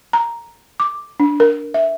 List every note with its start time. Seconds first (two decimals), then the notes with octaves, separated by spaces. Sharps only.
0.13 A#5
0.80 D6
1.20 D4
1.40 A#4
1.74 E5